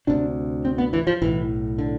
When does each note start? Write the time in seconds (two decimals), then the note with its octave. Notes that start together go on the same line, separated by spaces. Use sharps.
0.07 D2 C3 D4
0.65 C4
0.78 B3
0.93 E3
1.07 F3
1.22 B1 A2 E3
1.78 D3